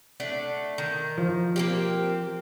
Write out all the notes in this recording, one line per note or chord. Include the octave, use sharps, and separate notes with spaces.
A3 D4 F#5
D#3
F3
A#3 C4 G4